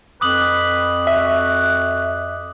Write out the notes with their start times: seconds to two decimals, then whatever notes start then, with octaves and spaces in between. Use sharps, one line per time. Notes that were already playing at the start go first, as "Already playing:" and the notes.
0.21 F2 B4 D6 D#6 F#7
1.07 F#4 E5